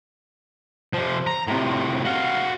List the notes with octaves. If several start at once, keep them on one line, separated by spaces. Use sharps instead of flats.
C3 F3
A#5
A2 C3
F#4 F5